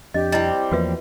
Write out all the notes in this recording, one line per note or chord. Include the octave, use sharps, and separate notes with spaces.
F2 D4 G4 D#5
G3 C4 E4 D#5
E2 F3 A#3 F#4 B4 E5